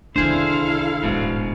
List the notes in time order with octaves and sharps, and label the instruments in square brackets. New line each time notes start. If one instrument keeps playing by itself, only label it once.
[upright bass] C2 D#3 [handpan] D4 [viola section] E4 A4 F5 [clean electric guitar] G#4 C5
[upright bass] D1 A1 [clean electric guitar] G#2 B2